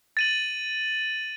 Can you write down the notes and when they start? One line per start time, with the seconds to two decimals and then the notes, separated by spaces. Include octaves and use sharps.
0.17 A6 D#7 F#7